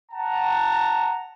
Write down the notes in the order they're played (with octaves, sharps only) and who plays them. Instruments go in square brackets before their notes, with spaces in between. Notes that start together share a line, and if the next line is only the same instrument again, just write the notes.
[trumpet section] F#5 A5 A#5